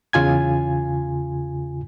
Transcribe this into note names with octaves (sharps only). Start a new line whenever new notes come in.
E2 C#3 F4 G#5 G#6